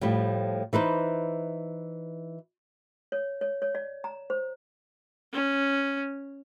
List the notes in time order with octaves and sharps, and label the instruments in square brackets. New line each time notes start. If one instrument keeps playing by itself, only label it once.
[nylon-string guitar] A2 F3 G3
E3 D#4 B4 C5
[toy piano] C#5
C#5
C#5
D5
A#5
C5
[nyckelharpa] C#4